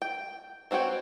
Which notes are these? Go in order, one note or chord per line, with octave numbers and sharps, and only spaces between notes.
G5
E3 C4 F#4 C#5 G5